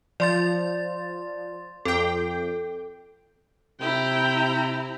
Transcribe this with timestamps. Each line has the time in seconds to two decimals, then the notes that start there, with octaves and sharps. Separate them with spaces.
0.20 F3 D5 C6 A6
1.85 F2 A4 G5
3.81 C3 E4 G5 A#5